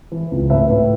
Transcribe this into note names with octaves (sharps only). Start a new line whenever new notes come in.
E3
C#2
A2 B4 E5
A2